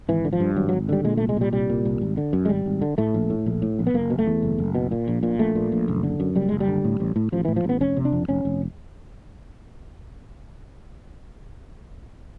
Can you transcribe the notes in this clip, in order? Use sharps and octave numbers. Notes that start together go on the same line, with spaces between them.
G#1 E3
D3
F3
G2
G#1 F#3
F#3
G#1
D3 G3
A#2 G#3
A3
C2
G#3
A#2 G3
C2 G3
A#2
C2
G#1
D3
F#2
G#3
G#1 G3
G#1
D3
A2 A3
A#1
A2
A#1
A2
A#1
B3
F#1 A#3
B2
A3
E2
F#1
F#1
B2
A#2
A#1
A#2
A#1 A3
A#2
A#1
F#1
D3
F#2
F#1 G3
F#1 G#3
G3
D3
A2
A1
A2
A1 F3
A2 E3
F3
A1 B3
F1 C#4
C3
D4
F2
F1 C#4
F1